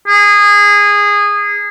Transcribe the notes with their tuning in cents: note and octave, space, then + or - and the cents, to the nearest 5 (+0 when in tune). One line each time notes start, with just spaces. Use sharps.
G#4 -20